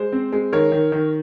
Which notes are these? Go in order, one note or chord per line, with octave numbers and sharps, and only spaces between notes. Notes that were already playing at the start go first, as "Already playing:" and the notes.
Already playing: G#3 C5
C4
G#3
D#3 A#4 C#5
D#3
D#3